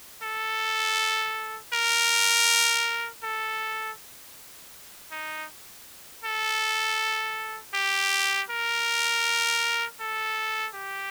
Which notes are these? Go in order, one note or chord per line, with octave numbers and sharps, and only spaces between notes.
A4
A#4
A4
D#4
A4
G4
A#4
A4
G4